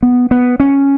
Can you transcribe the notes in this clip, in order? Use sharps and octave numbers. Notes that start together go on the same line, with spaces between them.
B3
B3
C#4